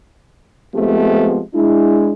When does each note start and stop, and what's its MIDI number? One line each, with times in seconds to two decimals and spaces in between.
0.75 1.39 53
0.75 1.39 56
0.75 1.39 57
0.75 1.39 59
0.75 1.39 60
0.75 1.39 67
1.54 2.12 56
1.54 2.12 62
1.54 2.12 64